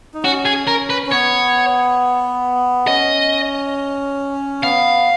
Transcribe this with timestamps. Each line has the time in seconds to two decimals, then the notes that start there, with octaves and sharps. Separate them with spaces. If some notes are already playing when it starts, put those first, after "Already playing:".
0.14 D#4
0.23 C#4 F#4
0.45 G#4
0.67 C#4 A#4
0.90 B4
1.06 C#4
1.12 B3 C#5
2.87 C#4 D#5
4.63 B3 F5